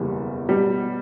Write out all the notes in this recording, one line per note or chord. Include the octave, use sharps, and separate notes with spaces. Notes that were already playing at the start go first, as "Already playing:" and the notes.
Already playing: F#1 E2 B2 G3
B2 G3